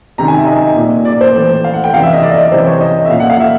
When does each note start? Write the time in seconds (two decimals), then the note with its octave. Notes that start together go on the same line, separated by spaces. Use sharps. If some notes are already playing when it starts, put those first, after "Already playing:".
0.18 C3 D#3 A#5
0.28 G#5
0.38 E5
0.47 D#5
0.76 A#2
1.05 D5
1.21 C5
1.35 A2 E3
1.64 F5
1.73 F#5
1.84 G5
1.93 C3 E3 F5
2.03 E5
2.13 D#5
2.23 D5
2.32 D#5
2.41 D5
2.52 C3 E3 C5
2.66 C#5
2.81 D#5
3.05 E5
3.10 A#2 F5
3.20 F#5
3.30 F5
3.40 E5